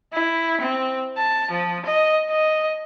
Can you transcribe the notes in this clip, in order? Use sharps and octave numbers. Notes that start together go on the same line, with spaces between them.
E4
C4
A5
F3
D#5
D#5